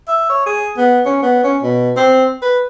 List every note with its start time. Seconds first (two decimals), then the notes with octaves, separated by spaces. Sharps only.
0.08 E5
0.29 C#5
0.46 G#4
0.77 B3
1.06 C#4
1.22 B3
1.44 C#4
1.62 B2
1.97 C4
2.42 B4